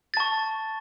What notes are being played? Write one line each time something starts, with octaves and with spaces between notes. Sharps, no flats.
A5 C#6 A6